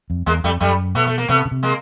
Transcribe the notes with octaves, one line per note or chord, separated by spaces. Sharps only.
F2
E2 G#3 A#3
F2 G3 A3
F#2 G3 A3
B2 A3 B3
A3
A#3
C3 A3 B3
C#3
C3
G#3 A#3